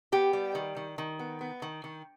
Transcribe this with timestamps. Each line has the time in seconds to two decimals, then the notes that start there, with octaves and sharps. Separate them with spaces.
0.12 B3 G4
0.33 G3
0.55 D#3
0.77 D#3
0.98 D#3
1.19 B3
1.41 B3
1.62 D#3
1.84 D#3